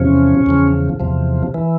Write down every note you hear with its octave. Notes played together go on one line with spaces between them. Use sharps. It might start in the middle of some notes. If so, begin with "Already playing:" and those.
Already playing: E2 C3 F3 C#4
E2 C#3 F3
E2 C3 F3
E3